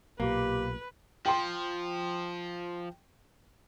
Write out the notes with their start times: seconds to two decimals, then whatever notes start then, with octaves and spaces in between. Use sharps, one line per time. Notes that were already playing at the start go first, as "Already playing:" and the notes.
0.20 B1 A#2 A#3 G4 B4
1.26 F3 G5 C6